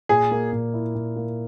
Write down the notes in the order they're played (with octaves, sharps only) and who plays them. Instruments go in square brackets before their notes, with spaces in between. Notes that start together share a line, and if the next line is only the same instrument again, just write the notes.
[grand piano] A#2 [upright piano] G#4
[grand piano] A#3
A#2
E4
A#2
A#3